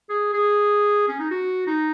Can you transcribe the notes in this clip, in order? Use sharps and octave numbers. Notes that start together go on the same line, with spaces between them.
G#4
G#4
C#4
D#4
F#4
D#4